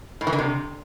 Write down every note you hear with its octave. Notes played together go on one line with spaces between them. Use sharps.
A2
E3
D3
C3